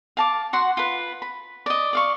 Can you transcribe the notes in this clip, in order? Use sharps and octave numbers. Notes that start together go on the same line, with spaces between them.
F5 A5 D6
F#4 F#5 C6
F4 B4
B5
D5 D#5
D5 F5 C#6